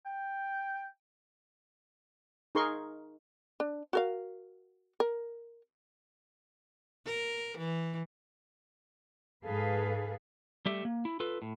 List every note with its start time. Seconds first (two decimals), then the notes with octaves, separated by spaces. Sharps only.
0.06 G5
2.55 D#4 G#4 A#4 C6 C#6
3.60 D4
3.93 F#4 A#4 F5
5.00 A#4
7.06 A#4
7.58 E3
9.45 G#2 G#4 A4 B4 F5
10.66 G3 A3 G4 E5
10.85 A#3
11.05 E4
11.20 F4 A4 B4
11.42 A2